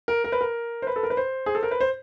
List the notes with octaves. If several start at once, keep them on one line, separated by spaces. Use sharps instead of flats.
A#4
A#4
B4
A#4
C5
B4
A4
A#4
B4
C5
G#4
A4
A#4
B4
C5